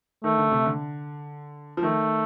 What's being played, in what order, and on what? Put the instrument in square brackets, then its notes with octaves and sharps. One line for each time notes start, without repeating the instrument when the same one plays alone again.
[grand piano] D#3 [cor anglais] A3
[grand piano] D3
C3
D3
F3
[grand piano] D#3 [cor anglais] A3